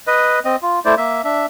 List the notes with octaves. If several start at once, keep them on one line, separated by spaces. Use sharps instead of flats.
B4 D#5
C4 D#5
F4
A3 E4 C5 D5
A#3 E5
D4 E5